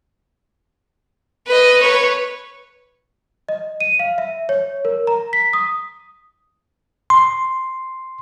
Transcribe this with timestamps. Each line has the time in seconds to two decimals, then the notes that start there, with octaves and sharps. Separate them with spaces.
1.47 B4 D#5
1.80 B4 C#5
3.49 D#5
3.81 D#7
3.99 F5
4.18 E5
4.49 C#5
4.85 A#4
5.07 A#5
5.33 B6
5.53 D#6
7.10 C6